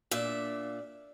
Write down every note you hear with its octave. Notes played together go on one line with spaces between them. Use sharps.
A#2 D4 E5